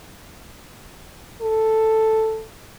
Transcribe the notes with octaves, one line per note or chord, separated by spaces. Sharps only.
A4